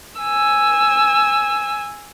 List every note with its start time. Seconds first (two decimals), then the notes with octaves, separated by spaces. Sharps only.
0.21 G#5 E6